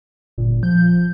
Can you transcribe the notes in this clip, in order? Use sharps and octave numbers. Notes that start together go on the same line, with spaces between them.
G1 A#2
F3 G6